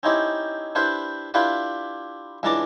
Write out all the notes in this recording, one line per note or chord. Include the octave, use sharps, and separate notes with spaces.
C4 C#4 D#4 E4 G4
D4 E4 G4 B4 C5
D4 E4 F4 G4 B4 D5
C#2 E3 D4 A5 A#5 D6